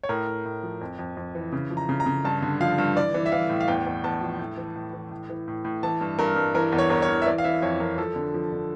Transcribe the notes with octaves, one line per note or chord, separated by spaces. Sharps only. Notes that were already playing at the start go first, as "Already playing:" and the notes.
C#5
A2 A#4
A2
A2
F3
F2
F2
F2
E3
C#3
F3
A#5
C#3
A#5
C#3
G2 A5
D3
F3 F5
G2
E3 D5
E3
E5
E3 F5
A2
F5
E2 G5
E2
E2 A5
F3
A2
E3
A2
E3
A2
E3
A2
A2
E3 A5
G2
G2 A#4
G2
E3 A#4
E2
C#5
E2 A#4
C#5
E3
E5
E3 D5
F5
E3 E5
F2 C#5
F2 A#4
F3 A4
D3
F3
D3